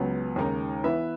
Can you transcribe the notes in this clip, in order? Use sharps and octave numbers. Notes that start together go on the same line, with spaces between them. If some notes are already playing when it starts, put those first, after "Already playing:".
Already playing: C#2 C#3 F#3 B3
D#2 C#3 G#3 D#4 A#4
E3 B3 E4 B4 E5